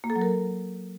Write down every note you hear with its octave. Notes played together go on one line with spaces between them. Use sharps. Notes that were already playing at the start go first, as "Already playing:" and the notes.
A#3
A4
F#3
A#4